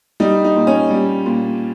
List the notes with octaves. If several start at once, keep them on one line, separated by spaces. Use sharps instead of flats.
G3 D#4
D#4
A#2
C#4
G3
A#2